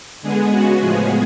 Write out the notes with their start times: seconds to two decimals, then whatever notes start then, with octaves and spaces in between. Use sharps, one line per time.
0.22 D3 G#3 B3 G#4
0.51 C#3 G#3 B3 F#4
0.80 A2 F3 G#3 B3 G#4